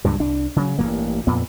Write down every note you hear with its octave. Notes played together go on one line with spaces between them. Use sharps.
C#2 G2 A#2
C2 D4
C#3 F#3
A1 G2 D#3 A#3
F2 A#2 B3